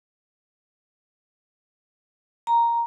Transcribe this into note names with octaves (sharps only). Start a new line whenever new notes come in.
A#5